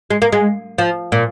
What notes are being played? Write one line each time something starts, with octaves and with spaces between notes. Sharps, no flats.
G#3
A#3
G#3
F3
A#2